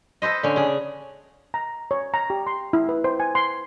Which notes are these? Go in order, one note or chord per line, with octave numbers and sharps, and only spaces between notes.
A4 B4 C5 D#5
D3 C#4
C#3 G#4
A#5
C#5
A#5
G4
C6
E4
B4
C5
G#5
C6